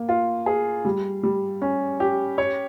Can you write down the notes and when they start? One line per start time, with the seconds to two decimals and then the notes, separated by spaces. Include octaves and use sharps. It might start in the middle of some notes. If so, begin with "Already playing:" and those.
Already playing: A#3
0.09 F4
0.46 G#4
0.85 G3
1.23 G3
1.62 C#4
2.00 G4
2.38 C#5